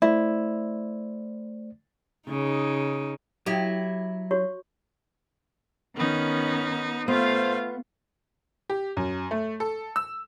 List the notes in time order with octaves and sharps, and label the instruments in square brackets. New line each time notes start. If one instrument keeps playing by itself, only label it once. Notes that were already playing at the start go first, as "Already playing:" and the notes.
[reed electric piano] A3 C5 D5 [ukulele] E4
[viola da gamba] C#3 D#4
[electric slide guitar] F#3 [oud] E4 G4 [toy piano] D#6
[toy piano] F#4 C#5 C#6
[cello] D#3 C#4 [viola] B3 D#4
[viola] A3 F5 [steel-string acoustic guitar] B3 [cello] F4 [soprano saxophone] C5
[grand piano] G4
F#2
A3
A4
E6